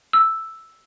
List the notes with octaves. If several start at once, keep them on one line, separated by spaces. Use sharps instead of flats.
E6